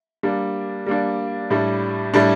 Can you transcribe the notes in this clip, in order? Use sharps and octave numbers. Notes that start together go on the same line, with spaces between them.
G3 A#3 D4
G3 A#3 D4
A2 G3 D4
A2 G3 D4